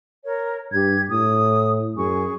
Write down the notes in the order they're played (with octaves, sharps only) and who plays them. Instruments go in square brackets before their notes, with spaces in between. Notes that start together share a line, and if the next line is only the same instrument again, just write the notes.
[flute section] A#4 C#5
[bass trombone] G2 [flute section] G4 G#6
[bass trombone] A2 [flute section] D#6
[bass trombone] F#2 [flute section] G#4 G#5 C#6